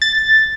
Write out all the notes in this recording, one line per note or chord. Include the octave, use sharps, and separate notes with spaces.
A6